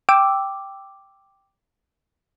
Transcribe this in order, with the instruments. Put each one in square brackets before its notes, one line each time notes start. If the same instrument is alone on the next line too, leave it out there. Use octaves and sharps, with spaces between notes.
[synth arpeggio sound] G5 D6 E6